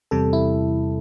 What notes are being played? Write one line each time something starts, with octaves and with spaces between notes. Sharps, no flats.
E2 C3 G3 A4
E4